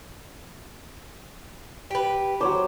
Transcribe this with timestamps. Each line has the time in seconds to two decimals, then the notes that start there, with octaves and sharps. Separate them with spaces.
1.91 G4 B4
2.41 F#3 C5 C#5 D6